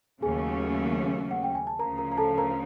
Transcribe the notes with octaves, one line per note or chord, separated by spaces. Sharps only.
D#2 C#3 F#3 A3 C#4 G#4 G#5
F#5
G5
G#5
A5
D2 C#3 F3 A#4 A#5
A#4 A#5
A#5
A4 A5
A#4 A#5